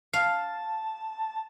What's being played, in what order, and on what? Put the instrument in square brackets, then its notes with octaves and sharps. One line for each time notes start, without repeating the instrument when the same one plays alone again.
[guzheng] F5 [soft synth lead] A5